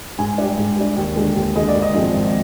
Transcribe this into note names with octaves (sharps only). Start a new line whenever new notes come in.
G#2 G#5
G3 D4
G#2
G3 D4
D#2
D3 G#3
D#2
D3 G#3 D#5
D5
G#1
D#5
G#2 F3 G#3 C4
G#1